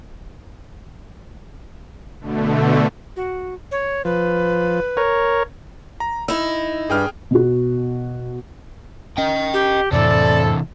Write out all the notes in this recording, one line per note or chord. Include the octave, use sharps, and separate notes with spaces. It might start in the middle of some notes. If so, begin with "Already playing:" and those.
B2 D3 A3
F#4
C#5
F3 B4
A#4 C#5
A#5
D#4 E4 E6
G2 G#4 G5 F6
B2 B3 F#4
C#4 D#5 G5
G4
F2 A2 C3 E3 C4 E4 A4 D5